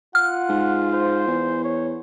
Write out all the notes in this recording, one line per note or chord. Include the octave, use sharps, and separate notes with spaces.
F4 F#5 F6
G#2
C5
E2
C#5